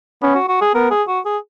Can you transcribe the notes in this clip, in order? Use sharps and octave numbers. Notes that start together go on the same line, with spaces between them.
B3 C#4
F#4
F#4
G#4
B3 A#4
G#4
F#4
G#4